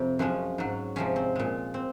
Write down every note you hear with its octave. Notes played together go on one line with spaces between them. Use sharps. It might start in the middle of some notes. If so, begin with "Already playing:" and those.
Already playing: F2 C3
F#2 F3 G#3 C#4
G#2 F#3
C3 F3 G#3 C#4
C4
A#2 G#3
C4